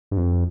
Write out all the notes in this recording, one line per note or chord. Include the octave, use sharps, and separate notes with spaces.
G2
F2